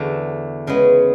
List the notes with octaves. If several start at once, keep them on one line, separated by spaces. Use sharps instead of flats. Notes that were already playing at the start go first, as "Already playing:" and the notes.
Already playing: E2 D3 A3 F#4
C#3 G#3 B3